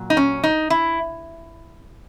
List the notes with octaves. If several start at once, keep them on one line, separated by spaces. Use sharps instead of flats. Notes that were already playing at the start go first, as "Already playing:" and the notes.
Already playing: A#2 F#3
D#4
C#4
D#4
E4